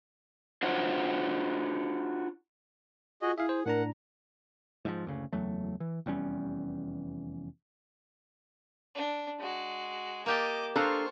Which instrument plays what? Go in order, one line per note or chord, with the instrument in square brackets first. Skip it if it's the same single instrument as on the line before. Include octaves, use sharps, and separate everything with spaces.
[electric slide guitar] D4 F4 F#4 C5 C#5
[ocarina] F4 [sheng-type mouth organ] F#4 G#4 D#5
[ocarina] E4 [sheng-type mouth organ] G#4 [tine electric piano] E5 F5
[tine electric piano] C5
[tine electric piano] A2 D4 A#5 [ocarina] A#4 [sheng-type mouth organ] F#5
[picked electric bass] G#2 E3 F3
F#1 D2 C#3
F#1 E2 F#3 A3
E3
F1 E2 G3 C#4
[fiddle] D4
G#3 F#4
[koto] A#3 G4 A5 [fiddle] D#5 D6
[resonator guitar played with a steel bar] D4 A4 A#5 [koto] F4 [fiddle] C5 C#6